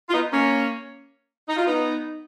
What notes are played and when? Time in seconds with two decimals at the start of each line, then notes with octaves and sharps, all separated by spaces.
0.09 F4
0.13 B3 D#4
0.32 A#3 C#4
1.48 D#4
1.57 F4
1.66 B3 D#4